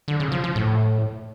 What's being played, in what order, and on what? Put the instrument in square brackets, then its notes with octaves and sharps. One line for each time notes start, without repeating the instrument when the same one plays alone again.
[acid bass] D3
C#3
F3
F3
A2